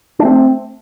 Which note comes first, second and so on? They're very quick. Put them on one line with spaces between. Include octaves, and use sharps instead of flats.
D4 A3 C4